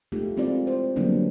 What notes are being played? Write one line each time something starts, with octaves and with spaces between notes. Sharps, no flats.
G#3 A3 D#4 F4 G4
G#3 C4 E4 F4 D5
C5
D3 F#3 G3 A#3 B3 D4